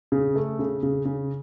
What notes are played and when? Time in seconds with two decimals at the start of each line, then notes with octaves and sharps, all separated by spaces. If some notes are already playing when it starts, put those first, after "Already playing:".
0.12 C#3
0.35 A3
0.59 C#3
0.83 C#3
1.05 C#3